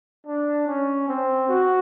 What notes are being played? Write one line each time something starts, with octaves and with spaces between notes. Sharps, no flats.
D4
C#4
C4
F#4